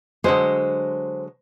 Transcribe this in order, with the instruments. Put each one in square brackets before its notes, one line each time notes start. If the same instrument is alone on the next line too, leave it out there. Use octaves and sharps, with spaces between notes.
[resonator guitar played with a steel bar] D3 F#3 G#3 [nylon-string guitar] C5